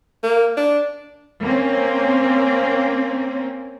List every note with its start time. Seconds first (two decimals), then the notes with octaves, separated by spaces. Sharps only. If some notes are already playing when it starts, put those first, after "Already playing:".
0.23 A#3
0.57 D4
1.43 A#3 C4 C#4